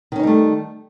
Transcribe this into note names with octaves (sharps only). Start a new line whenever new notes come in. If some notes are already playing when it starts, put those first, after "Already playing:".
D#3 G3 A3 C#4 D#4